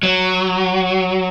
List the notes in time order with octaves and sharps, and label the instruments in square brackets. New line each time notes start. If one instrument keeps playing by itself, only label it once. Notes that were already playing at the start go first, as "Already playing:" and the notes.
[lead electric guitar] F#3